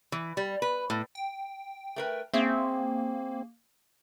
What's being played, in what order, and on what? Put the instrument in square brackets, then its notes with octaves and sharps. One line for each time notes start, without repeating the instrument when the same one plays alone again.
[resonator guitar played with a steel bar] E3
G3
B4
A2
[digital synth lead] G5
[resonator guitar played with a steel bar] A3 A#4 B4
[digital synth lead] A#3 [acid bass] C4 [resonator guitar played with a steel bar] C#4 G#4 E5